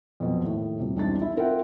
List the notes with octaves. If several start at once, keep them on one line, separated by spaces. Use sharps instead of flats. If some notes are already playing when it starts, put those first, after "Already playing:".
F2 B2 F#3
D#2 A2
D#1 C3
E1 C2 C4 D4 D#4 A6
E4
C4 F4 A#4 E5 F#5 G5